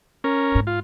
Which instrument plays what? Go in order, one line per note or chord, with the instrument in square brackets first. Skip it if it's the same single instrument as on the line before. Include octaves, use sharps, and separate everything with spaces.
[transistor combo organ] C#4 A#4
[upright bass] G#2
[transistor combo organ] F4